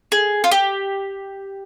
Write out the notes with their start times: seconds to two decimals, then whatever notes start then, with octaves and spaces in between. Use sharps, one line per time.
0.12 G#4
0.44 F4
0.51 G4